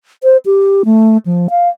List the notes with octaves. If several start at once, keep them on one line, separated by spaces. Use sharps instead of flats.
C5
G4
A3
F3
F5